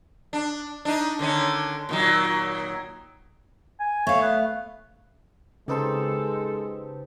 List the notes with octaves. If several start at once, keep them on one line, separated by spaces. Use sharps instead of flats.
D4
D4 D#4
D3 D#3 C#4
A#2 D#3 F#3
G#5
A3 C#5 F5
B3
C#3 G#3 C4 D#4 G4 A4 B4 A5